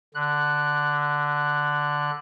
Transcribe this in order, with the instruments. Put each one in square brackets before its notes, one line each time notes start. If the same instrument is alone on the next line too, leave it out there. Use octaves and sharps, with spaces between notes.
[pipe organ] D3 F#6